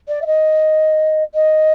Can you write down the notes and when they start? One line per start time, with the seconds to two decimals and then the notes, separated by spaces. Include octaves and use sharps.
0.08 D5
0.22 E5
0.26 D#5
1.35 D#5